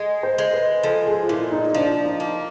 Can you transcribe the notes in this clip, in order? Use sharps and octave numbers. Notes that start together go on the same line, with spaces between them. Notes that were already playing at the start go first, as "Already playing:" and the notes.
Already playing: G#3
C5
G#3
B4
F3 A4
G#4
F4
A#2 E4
D#4
F3 D4
D#4
A#3